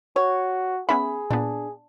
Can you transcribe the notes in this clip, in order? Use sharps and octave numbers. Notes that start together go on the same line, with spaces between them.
F#4 C#5
B3 C#4 G#4 E5 B5
A#2 B3 D4